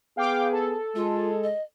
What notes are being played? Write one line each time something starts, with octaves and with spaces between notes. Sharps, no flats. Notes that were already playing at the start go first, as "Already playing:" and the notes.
B3 G#4 F5 G5 D6
A4
G#3 F4
D#5